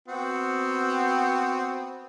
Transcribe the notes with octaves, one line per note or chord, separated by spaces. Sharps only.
B3 C4 F#4